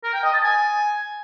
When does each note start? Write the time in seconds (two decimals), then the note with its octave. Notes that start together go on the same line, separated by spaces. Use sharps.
0.04 A#4
0.14 G5
0.24 D#5
0.34 A5
0.44 G#5